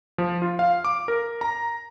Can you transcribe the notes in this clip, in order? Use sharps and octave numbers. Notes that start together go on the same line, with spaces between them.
F3
F4
F5
D6
A#4
A#5